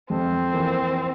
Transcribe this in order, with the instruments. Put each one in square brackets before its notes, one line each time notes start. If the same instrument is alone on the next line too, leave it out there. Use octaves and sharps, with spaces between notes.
[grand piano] F2 [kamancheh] C4
[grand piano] E3 A#3